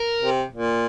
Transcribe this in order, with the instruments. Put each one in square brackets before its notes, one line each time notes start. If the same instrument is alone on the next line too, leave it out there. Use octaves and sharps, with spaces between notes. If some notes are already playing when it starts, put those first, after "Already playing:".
Already playing: [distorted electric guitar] A#4
[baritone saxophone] C3
A#2